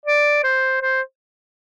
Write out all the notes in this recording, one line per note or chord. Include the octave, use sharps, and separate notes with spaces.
D5
C5
C5